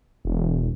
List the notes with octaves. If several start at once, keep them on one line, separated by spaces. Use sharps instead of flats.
E1